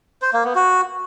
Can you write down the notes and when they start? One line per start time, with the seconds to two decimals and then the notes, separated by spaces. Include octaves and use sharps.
0.22 C5
0.33 A#3
0.44 B3
0.55 F#4